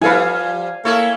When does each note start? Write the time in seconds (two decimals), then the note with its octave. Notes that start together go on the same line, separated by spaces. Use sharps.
0.01 F3 G3 E4 A4 B4 F5 G#5
0.85 A3 A#3 E4 A4 C#5